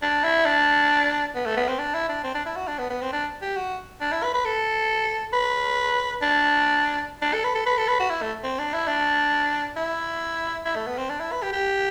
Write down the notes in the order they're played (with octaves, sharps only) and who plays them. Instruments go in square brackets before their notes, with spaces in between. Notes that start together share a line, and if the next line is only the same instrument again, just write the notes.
[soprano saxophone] D4
E4
D4
B3
A3
B3
C4
D4
E4
D4
C4
D4
E4
F#4
D4
B3
B3
C4
D4
G4
F#4
D4
E4
B4
B4
A4
B4
D4
D4
A4
B4
A4
B4
A4
B4
F#4
E4
A3
C4
D4
E4
D4
E4
E4
A3
B3
C4
D4
E4
B4
G4
G4